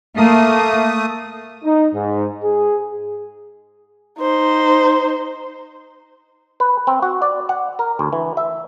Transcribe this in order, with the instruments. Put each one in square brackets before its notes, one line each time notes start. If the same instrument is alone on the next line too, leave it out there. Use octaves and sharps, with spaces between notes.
[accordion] A3 D#6 [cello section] A#3
[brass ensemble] D#4
G#2
G#4
[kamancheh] D#4 C5
[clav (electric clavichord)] B4
C4
F#4
D5
F#5
A#4
D2
E3
E5